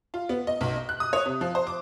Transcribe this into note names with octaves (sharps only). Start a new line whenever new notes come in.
F4
B3
D#5
B1
D#5
F#6
D#6
C#5
C3
F3
C5
D6